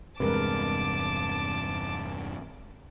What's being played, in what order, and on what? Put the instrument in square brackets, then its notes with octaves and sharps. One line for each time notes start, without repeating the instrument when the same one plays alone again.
[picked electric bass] E2 G2 C3 [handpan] G#3 A#4 B4 [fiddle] A5 D6